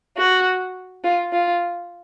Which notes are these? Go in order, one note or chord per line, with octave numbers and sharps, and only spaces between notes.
F#4
F4
F4